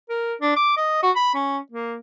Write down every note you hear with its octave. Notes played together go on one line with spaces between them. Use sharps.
A#4
D4
D6
D#5
F#4
B5
C#4
A#3